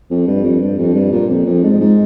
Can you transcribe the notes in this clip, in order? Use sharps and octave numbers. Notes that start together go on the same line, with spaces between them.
F2
G2
F2
G2
F2
G2
A#2
F2
F2
G#2
G#2